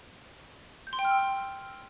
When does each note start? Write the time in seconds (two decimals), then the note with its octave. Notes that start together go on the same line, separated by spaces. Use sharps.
0.87 G6
0.93 C6
0.99 G5
1.05 F6
1.11 E6